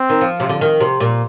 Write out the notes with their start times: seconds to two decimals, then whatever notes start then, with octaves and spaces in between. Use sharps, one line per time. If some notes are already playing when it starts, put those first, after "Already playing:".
Already playing: C4
0.10 D#3
0.21 F3
0.40 C3
0.49 D3
0.61 D#3
0.80 C3
1.00 A#2